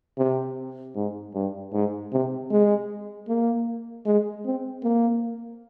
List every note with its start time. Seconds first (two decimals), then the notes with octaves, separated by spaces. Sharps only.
0.18 C3
0.96 G#2
1.34 G2
1.73 G#2
2.12 C3
2.51 G#3
3.28 A#3
4.06 G#3
4.45 C4
4.84 A#3